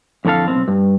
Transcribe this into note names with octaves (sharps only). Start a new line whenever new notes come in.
F2 A2 D3 A4 F5
B1 B2 C4
G2